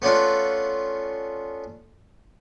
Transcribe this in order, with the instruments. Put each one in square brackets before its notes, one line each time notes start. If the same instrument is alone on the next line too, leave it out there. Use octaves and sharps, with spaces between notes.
[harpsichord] A3 B3 C#4 D4 F4 A4